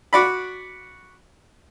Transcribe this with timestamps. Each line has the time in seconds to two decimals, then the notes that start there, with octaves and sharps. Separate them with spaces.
0.13 F#4 D5 B5